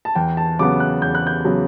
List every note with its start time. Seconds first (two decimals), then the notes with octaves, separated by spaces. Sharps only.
0.05 A5
0.15 E2 G5
0.37 A5
0.59 C#3 F#3 B3 D6
0.80 F#6
1.01 E2 G6
1.15 F#6
1.27 G6
1.45 C#3 F#3 B3